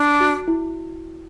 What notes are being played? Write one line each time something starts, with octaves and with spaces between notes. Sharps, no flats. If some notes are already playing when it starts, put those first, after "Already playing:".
Already playing: D4
F#4
E4